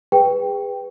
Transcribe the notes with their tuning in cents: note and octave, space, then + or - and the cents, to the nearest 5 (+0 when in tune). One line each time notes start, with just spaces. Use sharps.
G#4 -30 B4 +0 G5 +0